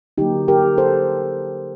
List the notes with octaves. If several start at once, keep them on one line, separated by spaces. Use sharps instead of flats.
D3 F#3 A#3 D#4 G4
G4 A#4
A4 C5